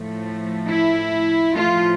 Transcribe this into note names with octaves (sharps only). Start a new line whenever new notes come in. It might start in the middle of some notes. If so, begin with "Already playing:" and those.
Already playing: A2 F3 A3
E4
A2 F3 A3 F4